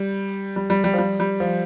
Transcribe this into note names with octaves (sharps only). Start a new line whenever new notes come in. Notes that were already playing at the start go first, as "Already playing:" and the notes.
Already playing: G3
G3
G3
G3
F3
G3
G3
F3